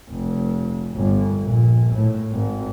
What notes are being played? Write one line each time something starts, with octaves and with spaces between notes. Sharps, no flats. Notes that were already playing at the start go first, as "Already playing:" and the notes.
F1
G1
A#1
A2
G#1